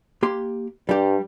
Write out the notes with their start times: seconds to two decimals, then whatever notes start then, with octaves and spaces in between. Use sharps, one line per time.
0.22 A#3 G4 C6
0.89 G2 G3 G4